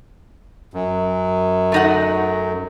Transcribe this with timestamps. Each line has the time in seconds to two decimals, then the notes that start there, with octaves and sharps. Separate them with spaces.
0.74 F#2
1.72 A3 D#4 F#5